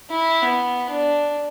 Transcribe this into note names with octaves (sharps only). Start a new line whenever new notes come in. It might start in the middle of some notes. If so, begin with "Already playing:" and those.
E4
B3
D4